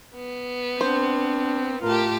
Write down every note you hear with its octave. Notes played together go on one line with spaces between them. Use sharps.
B3
C4 D4 C5
A2 F4 G4 A#4 A5